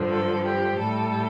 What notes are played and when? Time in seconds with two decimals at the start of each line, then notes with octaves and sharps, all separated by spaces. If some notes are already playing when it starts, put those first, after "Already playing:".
Already playing: G2 D3 F3
0.11 A4
0.45 G4
0.79 A2 G3 A4